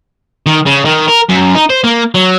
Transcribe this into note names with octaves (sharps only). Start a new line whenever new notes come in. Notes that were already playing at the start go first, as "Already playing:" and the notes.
D#3
C#3
D#3
A#4
F#2
D#4
C5
A#3
F#3